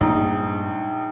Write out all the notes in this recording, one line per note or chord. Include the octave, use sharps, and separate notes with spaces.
A#1 G2 G#3 A3 D#4